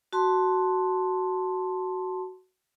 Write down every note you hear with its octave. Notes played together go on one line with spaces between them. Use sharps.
F#4 A5 C6